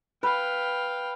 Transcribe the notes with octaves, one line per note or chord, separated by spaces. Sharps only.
B4 F5 G5